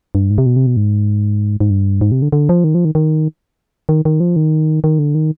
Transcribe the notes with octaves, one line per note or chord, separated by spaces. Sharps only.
G2
G#2
C3
B2
C3
B2
G#2
G#2
G2
G#2
C3
D3
D3
F3
D#3
F3
D#3
D#3
D#3
D#3
F3
D#3
D#3
D3
D#3